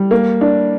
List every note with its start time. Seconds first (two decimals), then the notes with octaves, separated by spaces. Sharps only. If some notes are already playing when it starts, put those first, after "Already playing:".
Already playing: G3
0.11 A#3
0.41 D4